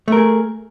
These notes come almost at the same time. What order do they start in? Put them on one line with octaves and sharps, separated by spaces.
A3 A#4 G#4